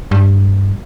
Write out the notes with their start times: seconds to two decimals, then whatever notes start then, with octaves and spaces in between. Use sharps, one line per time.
0.11 G2